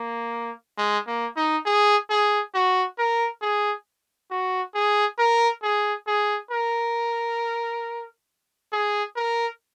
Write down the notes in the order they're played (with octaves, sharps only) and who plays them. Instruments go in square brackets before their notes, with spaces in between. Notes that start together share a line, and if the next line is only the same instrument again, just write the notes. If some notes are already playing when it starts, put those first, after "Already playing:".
Already playing: [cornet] A#3
G#3
A#3
D#4
G#4
G#4
F#4
A#4
G#4
F#4
G#4
A#4
G#4
G#4
A#4
G#4
A#4